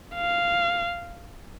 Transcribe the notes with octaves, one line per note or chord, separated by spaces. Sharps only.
F5